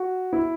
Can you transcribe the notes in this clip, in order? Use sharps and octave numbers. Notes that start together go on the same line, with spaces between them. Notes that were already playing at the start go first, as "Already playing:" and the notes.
Already playing: F#4
E4